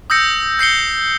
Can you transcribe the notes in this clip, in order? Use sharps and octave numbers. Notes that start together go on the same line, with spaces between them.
D#6 E6 G6 A#6 C#7
G6 C7 C#7 G7